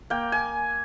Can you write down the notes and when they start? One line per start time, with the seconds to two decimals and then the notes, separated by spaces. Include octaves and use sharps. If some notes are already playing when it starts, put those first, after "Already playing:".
0.10 A#3 G5
0.32 G#5